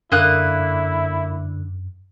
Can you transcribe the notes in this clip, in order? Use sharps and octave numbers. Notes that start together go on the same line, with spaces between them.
F#2 D3 A#3 E4 D#6 F#6